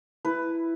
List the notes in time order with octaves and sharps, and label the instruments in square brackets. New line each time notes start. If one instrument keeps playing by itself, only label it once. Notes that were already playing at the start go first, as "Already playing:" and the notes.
[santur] E4 B4